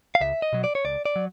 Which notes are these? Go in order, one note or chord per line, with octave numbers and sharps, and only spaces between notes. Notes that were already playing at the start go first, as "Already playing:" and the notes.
F5
C#2 E5
D#5
B2 F#3
D5
C#5
C#2 D5
D5
F#3